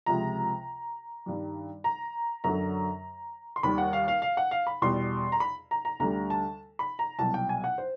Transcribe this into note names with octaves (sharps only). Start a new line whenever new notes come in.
C#2 C3 F3 A#5
G2 D#3 G3
A#5
F#2 D3 F#3 A#5
C6
D#2 D#3 G3 B5
F#5
F5
F5
F5
F#5
F5
B5
E2 B2 G3 C6
A#5
B5
A#5
A#5
D2 D3 G3 A#5
A5
B5
A#5
C2 B2 F#3 A5
G5
G#5
F#5
C5